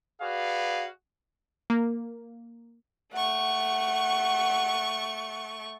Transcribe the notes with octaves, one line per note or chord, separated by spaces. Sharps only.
F#4 G#4 B4 D5 F5
A#3
A3 F#5 C#6